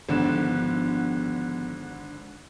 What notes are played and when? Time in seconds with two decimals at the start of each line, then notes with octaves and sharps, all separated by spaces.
0.09 G#1 D3 F3 B3 G4 E7